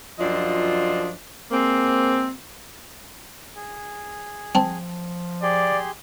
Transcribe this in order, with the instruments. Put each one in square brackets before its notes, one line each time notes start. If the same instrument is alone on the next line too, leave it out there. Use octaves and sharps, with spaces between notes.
[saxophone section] F#2 F3 D4 F4 D#5
G#3 A#3 C4
[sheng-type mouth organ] G#4
[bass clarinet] F3 [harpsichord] C4 A5
[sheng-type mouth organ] G4 G#4 C6 [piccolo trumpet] D5